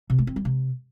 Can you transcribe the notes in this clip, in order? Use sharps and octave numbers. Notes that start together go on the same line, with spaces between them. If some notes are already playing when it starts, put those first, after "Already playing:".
C3
A3
C4
G3
C3